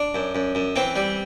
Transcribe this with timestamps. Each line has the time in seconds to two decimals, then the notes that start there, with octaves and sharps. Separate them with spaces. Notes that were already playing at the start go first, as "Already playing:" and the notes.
Already playing: D4
0.14 F#2
0.35 F#2
0.55 F#2
0.76 E3 C4
0.96 G3